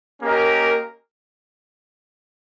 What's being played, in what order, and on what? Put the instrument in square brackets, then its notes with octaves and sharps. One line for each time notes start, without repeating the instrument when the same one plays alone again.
[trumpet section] A#3 C#4 G4 A#4 D#5